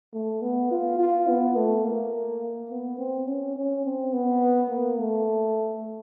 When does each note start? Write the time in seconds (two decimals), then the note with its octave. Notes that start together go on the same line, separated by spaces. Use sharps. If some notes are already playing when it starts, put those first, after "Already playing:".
0.13 A3
0.42 B3
0.71 F4
1.00 F4
1.28 B3
1.56 A3
1.84 A#3
2.71 B3
2.98 C4
3.27 C#4
3.56 C#4
3.85 C4
4.13 B3
4.69 A#3
4.99 A3